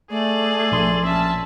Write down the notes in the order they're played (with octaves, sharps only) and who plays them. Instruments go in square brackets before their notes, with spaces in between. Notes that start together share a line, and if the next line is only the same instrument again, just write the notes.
[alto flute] A3 [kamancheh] G#4 D5
[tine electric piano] A#1 C6
[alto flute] C#4 [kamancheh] E5 A5